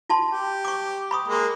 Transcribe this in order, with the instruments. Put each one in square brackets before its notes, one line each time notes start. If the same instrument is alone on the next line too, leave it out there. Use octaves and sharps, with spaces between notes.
[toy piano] F4 A5 C6
[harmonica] G4
[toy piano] C#6 D6
B5 C#6 D#6
[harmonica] G#3 A#3